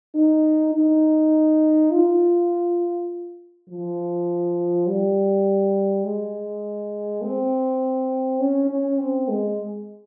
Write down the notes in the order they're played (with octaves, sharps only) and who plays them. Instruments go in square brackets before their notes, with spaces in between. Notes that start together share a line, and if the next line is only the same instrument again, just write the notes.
[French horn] D#4
D#4
F4
F3
G3
G#3
C4
C#4
C#4
C4
G#3